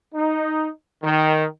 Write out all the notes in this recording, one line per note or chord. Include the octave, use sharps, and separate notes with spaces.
D#4
D#3